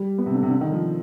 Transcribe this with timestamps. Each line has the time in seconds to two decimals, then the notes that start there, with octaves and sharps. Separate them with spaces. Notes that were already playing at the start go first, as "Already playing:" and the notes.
Already playing: G3
0.18 B3
0.26 C3
0.34 D3
0.43 C3
0.50 D3
0.61 D#3
0.72 F3